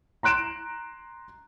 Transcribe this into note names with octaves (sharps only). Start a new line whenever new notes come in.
A#5 C6 F#6 D7 E7